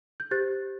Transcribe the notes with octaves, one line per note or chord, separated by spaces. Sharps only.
G6
G4 C5 F#6 A6